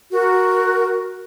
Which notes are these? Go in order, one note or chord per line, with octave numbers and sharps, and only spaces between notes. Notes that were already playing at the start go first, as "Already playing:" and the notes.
F#4 A#4